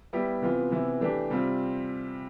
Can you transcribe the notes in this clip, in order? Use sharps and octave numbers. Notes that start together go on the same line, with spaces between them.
G3 B3 E4 G4
C3 E3 B3 F4
C3 E3 B3 E4
E3 A3 D4 G4
C3 G3 C4 F4